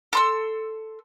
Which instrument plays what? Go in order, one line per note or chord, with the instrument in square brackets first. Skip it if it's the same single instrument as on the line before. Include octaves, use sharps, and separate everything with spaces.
[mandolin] A4 C6 E6